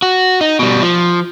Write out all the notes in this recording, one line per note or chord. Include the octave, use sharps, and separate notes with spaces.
F#4
D#4
B2 G3
F3